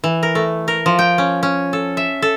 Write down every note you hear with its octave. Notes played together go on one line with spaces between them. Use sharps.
E3
A#4
A3
A#4
F3
G5
C#4
C#4
A4
E5
A4